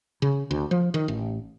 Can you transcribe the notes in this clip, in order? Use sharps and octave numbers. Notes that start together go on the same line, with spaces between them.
C#3
D2
F3
D#3
A1